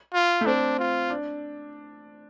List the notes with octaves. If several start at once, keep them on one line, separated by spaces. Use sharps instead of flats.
F4
A3
C4 D4
F4
D4